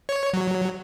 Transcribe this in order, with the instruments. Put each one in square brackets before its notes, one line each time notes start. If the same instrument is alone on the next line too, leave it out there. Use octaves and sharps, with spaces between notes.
[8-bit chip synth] C#5
F#3